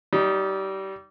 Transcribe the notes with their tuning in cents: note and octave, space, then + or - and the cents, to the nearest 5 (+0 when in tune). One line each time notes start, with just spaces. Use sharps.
G3 -25 D#4 +0